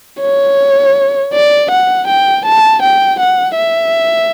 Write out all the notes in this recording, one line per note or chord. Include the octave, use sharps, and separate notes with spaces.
C#5
D5
F#5
G5
A5
G5
F#5
E5